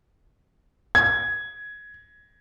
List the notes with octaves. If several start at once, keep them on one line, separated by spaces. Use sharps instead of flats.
G#6